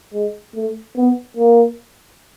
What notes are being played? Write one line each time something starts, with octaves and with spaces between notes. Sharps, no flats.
G#3
A3
B3
A#3